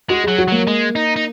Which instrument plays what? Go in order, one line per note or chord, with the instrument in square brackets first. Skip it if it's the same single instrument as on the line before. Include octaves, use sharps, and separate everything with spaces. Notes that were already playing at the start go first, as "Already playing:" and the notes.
[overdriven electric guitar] G#3 [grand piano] F#4
[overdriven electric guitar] F#3 [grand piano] G#4
[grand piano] F#4
[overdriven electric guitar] F#3 [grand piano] A#3
[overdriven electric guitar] G#3
D#4
D#4